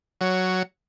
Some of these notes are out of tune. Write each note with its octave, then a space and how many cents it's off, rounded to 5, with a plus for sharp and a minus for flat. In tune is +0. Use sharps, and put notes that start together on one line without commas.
F#3 +0 C#5 +10